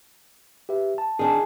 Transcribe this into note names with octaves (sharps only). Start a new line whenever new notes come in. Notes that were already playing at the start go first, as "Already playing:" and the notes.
G4 B4 E5
A5
D#3 D4 G#4